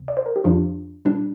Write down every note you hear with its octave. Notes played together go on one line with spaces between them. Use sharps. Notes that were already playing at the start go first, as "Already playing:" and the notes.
Already playing: D2 C3
D5
C5
A#4
G4
F2 F3 D4 F4
A#2 G3 D4